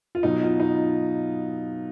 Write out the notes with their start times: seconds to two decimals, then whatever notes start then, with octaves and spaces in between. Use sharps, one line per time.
0.15 F4
0.23 B2 F#3 D#4
0.42 F4
0.60 D#4